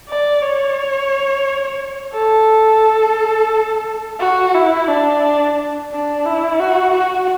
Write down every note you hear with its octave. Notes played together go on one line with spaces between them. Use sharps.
D5
C#5
A4
F#4
E4
D4
D4
E4
F#4
F#4